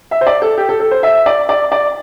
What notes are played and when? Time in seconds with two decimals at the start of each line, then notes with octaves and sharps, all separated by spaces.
0.11 E5
0.21 C5
0.27 D5
0.42 A4
0.58 G4
0.69 A4
0.80 A4
0.91 C5
1.03 E5
1.26 D5
1.49 D5
1.72 D5